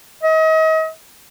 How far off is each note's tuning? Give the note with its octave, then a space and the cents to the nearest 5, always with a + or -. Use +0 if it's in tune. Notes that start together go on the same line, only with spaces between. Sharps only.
D#5 +40